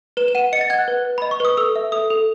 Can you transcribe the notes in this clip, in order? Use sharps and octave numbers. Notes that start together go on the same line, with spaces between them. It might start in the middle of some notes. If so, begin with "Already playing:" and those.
B4 E7
E7
F#5 D#7
D#5 C#7
A6
F#5 G#6
F#6
B4
B4
D#5 B5
C#6
B4 D#6
A4 E6
E5
A4 D#6
A4